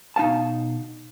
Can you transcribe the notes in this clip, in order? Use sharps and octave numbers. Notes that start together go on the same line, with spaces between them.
B2 D#4 F5 A5